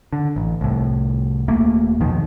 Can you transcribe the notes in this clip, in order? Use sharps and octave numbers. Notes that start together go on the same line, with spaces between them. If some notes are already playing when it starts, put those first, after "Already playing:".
D3
A1
C2 A2
D#1 A3 A#3
C2 F2 B2 D#3